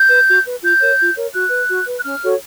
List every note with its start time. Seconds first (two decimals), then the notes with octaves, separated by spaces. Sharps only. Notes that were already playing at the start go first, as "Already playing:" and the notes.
Already playing: G6
0.09 B4
0.27 F#4
0.45 B4
0.62 F4 G6
0.80 A#4 C#5
0.98 F4
1.16 A#4 C#5
1.33 F#4 F#6
1.50 B4
1.69 F#4
1.87 B4
1.98 F#6
2.04 C#4 F6
2.22 F#4 A4 C#5